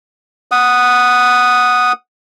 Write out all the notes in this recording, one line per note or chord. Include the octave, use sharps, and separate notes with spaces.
F#5 D#6